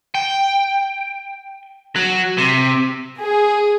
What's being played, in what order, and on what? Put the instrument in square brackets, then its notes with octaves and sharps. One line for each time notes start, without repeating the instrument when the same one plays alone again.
[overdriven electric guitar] G5
F#3
C3
[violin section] G#4